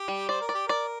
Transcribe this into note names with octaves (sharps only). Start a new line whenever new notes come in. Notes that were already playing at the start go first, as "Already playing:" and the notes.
Already playing: G4
G3
C5 D5
A#4
D5
G4
A#4 D5